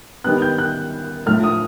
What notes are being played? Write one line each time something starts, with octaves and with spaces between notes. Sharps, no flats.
D#3 G3 B3 F#6
G6
F#6
A2 F3 A3 F6
D#6